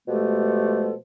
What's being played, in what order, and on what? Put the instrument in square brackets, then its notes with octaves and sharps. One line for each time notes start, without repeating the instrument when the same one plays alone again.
[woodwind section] B2 F3 G#3 A3 G4 A4